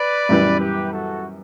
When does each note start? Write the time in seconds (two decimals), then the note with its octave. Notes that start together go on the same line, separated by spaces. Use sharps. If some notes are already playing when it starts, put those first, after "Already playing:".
Already playing: B4 D5
0.29 F#2 E3 G3 B3
0.60 G4 B4
0.91 F#4 A4